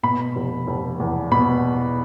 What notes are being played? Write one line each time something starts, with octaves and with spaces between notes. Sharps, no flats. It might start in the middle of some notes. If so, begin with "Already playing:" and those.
B2 B5
F1
F1
E2
B2 B5